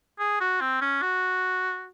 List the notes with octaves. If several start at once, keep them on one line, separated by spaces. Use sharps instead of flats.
G#4
F#4
C4
C#4
F#4